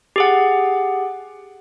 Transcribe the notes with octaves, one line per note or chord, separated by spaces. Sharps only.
G4 G#4 F#5